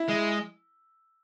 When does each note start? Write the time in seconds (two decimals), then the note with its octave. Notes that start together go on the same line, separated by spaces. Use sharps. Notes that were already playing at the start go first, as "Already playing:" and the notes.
Already playing: E4
0.09 G#3